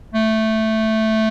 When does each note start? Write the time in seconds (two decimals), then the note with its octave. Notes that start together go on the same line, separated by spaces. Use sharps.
0.14 A3